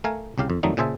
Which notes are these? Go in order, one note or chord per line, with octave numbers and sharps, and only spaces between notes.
A3 A#4 F5 G#5
C2 C#3 G4 F5
F2
F2 D#3 F#3 G3 A3 D#4
A#2 C#3 G#4 C5 E5 A5